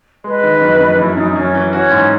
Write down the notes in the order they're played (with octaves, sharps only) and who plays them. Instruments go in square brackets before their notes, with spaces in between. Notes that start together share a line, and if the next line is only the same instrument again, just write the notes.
[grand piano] G#3 [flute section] B4 D#5
[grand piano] D#3
F#2
F#2
[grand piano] F#2 [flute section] E4
[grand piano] F#2 [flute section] D#4
[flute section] D#4
[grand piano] F#2 [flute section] C#4
[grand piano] E3
[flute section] C#4 [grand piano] F#4
[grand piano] G#2